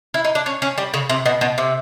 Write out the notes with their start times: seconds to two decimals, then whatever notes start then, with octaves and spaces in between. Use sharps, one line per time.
0.14 E4
0.24 D#4
0.35 D4
0.46 C#4
0.62 C#4
0.78 G3
0.94 C#3
1.09 C3
1.26 B2
1.41 B2
1.58 C3